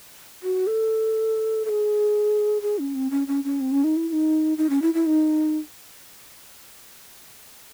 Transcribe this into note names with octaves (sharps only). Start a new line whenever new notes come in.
F#4
A4
A4
G#4
G#4
C#4
C4
C#4
C#4
C#4
C4
C#4
D#4
E4
E4
D#4
D#4
C#4
E4
E4
D#4